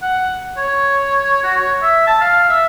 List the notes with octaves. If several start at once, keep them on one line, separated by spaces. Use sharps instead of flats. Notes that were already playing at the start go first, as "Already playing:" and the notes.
F#5
C#5
F#4
C#5
E5
A5
F5
E5